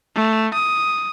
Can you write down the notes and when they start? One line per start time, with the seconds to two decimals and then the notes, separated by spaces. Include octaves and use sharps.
0.15 A3
0.54 D#6